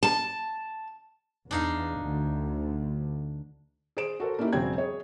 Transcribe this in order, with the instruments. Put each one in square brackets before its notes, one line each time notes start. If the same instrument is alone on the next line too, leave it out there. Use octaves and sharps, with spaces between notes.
[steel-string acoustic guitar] A5
[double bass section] E2 [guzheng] D4 D#4 F5
[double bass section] D2
[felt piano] G#4 C5 D7 E7
F#4 A4 A#4 C5
A#3 C#4 D#4 E4 G4
E1 C#3 F#3 C4 G5 G#6
G#4 C#5